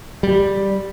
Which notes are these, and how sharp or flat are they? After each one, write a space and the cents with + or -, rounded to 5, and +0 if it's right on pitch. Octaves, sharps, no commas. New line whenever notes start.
G3 +0